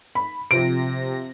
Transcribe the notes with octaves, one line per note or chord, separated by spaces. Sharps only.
B5
C3 F3 A#6 D7